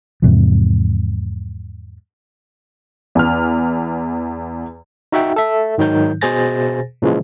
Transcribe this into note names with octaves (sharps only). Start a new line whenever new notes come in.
E2 G#2 C3 F3
E2 F6
D#4 F#4 E5 F#5 G5
A4 E5
G#2 D#3 F#3 D#4 G6
B2 G#4 C5 G#5 A6 A#6
A#2 C#3 E3 F3 G#3